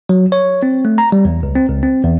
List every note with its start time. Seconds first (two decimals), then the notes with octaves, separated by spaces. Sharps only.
0.09 F#3
0.32 C#5
0.63 C4
0.85 A3
0.98 A#5
1.12 G3
1.25 E2
1.43 C#2
1.55 C4
1.69 C#2
1.83 C4
2.04 E2